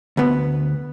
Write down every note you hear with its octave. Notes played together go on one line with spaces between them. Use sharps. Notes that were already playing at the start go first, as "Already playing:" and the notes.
D2 B3